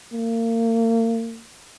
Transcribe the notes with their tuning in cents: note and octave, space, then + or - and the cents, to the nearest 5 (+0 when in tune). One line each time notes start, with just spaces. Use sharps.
A#3 -35